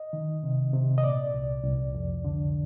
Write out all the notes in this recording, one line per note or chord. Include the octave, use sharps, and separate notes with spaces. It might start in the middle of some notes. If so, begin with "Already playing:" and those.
Already playing: D#5
D#3
C3
C3
D#5
A#2 D5
C2
C2
F2
D3